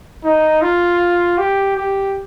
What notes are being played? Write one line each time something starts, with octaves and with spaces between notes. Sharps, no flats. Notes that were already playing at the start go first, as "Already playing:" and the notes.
D#4
F4
G4
G4